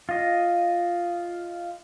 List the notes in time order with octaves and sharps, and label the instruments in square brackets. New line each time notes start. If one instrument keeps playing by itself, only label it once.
[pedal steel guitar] F4 D#5